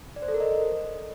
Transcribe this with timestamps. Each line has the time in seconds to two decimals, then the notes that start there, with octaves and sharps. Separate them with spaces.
0.16 D5
0.22 C5
0.28 A4
0.34 A#4
0.40 D#5